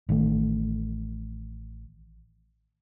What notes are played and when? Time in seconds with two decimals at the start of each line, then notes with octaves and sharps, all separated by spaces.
0.09 A1 D#3 F3 A3